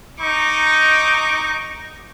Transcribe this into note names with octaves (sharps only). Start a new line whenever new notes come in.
D#4 C#6 D6